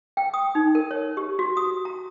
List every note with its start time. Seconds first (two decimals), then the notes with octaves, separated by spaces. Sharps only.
0.17 G5
0.34 D#6
0.55 D#4
0.75 A#4
0.91 C#5
1.17 G4
1.39 F#4
1.57 D#6
1.85 A#5